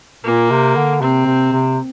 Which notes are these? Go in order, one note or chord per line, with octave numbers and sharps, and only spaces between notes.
A#2 A#3
C3
D3
C3 C4
C3
C3